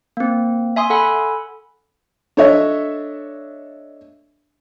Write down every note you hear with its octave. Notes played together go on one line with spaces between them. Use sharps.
A#3 C4
E5 G#5 C6 D#6
A4 F#5 G#5 B5
D4 A4 C#5 D#5 E5